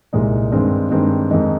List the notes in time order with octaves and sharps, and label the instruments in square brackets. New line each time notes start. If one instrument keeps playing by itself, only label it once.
[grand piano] C2 A#2 G#3 D#4
G2 D#3 G#3 C4
G2 D#3 G#3 C4
F2 D#3 G#3 D#4